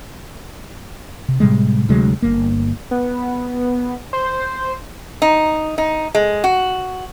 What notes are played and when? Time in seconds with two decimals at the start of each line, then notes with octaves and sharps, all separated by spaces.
1.28 C3
1.40 A2 C3 G3 G#3
1.89 D2 C3 F#3 G#3
2.22 G1 G2 A#3
2.91 B3
4.13 C5
5.22 D#4
5.78 D#4
6.15 G#3
6.44 F#4